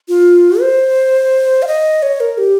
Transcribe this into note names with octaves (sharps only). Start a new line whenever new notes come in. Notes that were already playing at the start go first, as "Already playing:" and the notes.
F4
C5
F5
D#5
C#5
A#4
G4